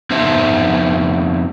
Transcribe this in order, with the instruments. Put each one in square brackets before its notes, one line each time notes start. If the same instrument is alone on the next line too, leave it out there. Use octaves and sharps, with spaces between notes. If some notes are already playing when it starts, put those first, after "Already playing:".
[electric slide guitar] F2 B3 D#4 C5 E5